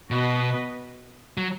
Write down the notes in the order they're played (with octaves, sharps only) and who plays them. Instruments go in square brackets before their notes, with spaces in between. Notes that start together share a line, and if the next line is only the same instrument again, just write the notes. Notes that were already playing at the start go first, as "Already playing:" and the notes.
[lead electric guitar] B2 [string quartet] B3 F#4 B4 D#5
[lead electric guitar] F#3